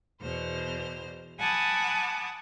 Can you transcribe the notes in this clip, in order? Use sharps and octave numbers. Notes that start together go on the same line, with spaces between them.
E2 B2 C5 F6
F#5 G#5 A5 B5 D6 D#6